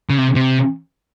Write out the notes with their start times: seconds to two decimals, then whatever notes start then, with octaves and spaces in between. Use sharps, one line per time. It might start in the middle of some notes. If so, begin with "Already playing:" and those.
0.10 C#3
0.18 C3
0.35 C3